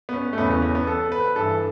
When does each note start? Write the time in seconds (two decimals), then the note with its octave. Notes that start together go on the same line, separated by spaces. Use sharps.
0.09 B3
0.13 C#4
0.33 A3
0.38 E2 C#3 E3 B3
0.51 C#4
0.62 B3
0.75 B3
0.87 A4
1.12 B4
1.36 G2 E3 A4